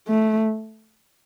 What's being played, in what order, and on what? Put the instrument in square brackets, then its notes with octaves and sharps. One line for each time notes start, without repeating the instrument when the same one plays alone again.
[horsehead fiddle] A3